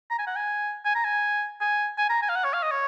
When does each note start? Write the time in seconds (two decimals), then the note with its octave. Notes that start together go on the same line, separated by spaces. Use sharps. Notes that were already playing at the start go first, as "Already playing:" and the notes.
0.11 A#5
0.19 G#5
0.27 F#5
0.36 G#5
0.85 G#5
0.95 A#5
1.05 G#5
1.61 G#5
1.98 G#5
2.10 A#5
2.22 G#5
2.29 F5
2.35 F#5
2.44 C#5
2.54 F5
2.63 D#5
2.72 C#5